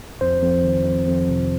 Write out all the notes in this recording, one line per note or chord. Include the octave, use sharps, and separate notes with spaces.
F2 C5
F2
D#3
F2
F2
C3